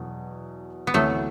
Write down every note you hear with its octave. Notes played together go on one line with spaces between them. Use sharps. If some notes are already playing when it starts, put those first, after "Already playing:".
Already playing: E2 B2 F#3
B3
D2 C3 E3 F#3 A3